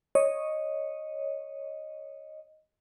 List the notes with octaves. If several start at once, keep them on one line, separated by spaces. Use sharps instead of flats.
C#5 D#5